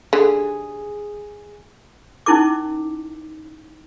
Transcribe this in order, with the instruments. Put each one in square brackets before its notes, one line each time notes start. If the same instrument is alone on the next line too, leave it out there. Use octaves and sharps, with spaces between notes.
[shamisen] D3 [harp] G#4
[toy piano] C#4 D#4 E4 A#4 D6